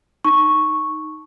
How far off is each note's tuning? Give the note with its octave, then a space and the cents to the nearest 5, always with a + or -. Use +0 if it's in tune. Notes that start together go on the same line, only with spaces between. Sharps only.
D#4 +0 A5 +0 C#6 -5